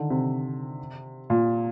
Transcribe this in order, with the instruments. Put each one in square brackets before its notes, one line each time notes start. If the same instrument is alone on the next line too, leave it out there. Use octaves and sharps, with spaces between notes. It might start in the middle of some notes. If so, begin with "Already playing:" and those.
Already playing: [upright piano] D3 D#3
C3
A#2